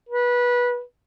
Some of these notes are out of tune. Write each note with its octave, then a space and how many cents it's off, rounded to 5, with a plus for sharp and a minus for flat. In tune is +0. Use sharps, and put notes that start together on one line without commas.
B4 -20